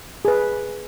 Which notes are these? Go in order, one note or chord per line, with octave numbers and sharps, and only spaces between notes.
G#4 B4